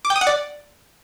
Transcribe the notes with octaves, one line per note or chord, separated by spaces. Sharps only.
D6
G5
D#6
F#5
D5